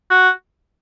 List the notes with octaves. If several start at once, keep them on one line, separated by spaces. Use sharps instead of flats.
F#4